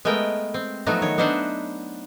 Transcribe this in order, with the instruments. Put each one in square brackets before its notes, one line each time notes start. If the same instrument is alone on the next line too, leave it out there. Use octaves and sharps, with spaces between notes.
[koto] G#3 A3 B3 A#4 G5
C4
F3 F#3 A3 B3 D#4 F#4
D#3 C#5
B3 D4 D#4 C5 E5 F#5